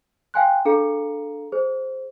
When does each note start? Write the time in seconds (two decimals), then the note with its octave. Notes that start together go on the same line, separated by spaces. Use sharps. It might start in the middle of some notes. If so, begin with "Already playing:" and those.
0.34 F5 G5 G#5 C6 F#6
0.65 D4 G#4 A4 F5 A#5 C#7
1.52 G#4 C5